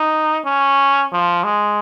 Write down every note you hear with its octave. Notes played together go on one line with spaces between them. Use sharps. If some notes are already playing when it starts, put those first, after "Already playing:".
Already playing: D#4
C#4
F3
G#3